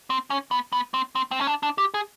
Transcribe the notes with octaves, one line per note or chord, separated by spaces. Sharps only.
C4
C#4
B3
B3
C4
C4
C4
C#4
D4
D4
G4
G#4